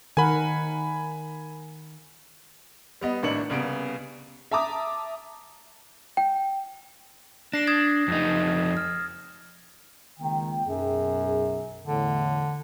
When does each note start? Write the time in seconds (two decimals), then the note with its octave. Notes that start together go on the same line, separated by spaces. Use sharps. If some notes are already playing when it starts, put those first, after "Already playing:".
0.17 D#3 A#4 F#5 G#5 B5
3.01 G3 B3 D#5
3.23 G#1 A2 A#3 D4 C#7 F#7
3.50 C2 C#3 B3 D7
4.51 E5 A5 A#5 D6 D#6
6.17 G5
7.53 D4 A#6 C7 E7
7.67 D#6 G#6 A6
8.08 F2 D#4
8.77 F6
10.20 C#2 D#3 A#3 G5
10.67 B1 F#2 G#4
11.86 E2 A2 D3